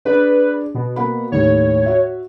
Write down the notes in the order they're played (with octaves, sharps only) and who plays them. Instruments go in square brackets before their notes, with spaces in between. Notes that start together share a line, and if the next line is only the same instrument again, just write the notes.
[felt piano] D4 G#4 D5 [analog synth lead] B4
[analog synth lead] B2
[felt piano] A#3 F#5 B5
[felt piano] D#2 A2 [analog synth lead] C#5
[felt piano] F#4 E5